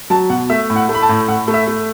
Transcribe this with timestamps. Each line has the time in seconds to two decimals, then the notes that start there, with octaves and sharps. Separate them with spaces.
0.10 F#3 A5
0.30 B2 F#5
0.50 A3 E5
0.70 A2
0.76 F#5
0.89 A3
0.95 B5
1.02 A5
1.09 A2
1.28 A2 F#5
1.48 A3
1.54 E5
1.67 A3